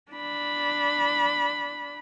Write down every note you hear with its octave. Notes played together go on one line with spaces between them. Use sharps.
D4 B5